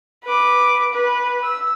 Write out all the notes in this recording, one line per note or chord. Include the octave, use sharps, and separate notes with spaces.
B4 D6
B4
E6